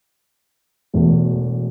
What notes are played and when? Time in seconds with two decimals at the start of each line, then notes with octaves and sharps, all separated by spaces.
0.93 E1 E2 B2 A3